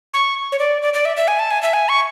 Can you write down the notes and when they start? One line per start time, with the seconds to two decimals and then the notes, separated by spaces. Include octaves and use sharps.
0.14 C#6
0.52 C#5
0.59 D5
0.82 D5
0.94 D5
1.05 E5
1.17 E5
1.28 G#5
1.39 A5
1.51 G#5
1.62 E5
1.73 G#5
1.89 C#6